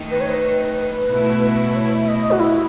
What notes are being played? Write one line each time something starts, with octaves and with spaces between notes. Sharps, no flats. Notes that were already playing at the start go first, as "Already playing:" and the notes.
Already playing: D#3 A3 D#4
B4
C#5
B4
B2 A3 E4
C#5
E5
D#5
F#4
E4